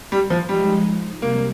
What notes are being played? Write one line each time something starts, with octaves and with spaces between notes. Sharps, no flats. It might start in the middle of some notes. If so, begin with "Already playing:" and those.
G3
F3
F3 G3 G#3 D#4
C3 G3 A#3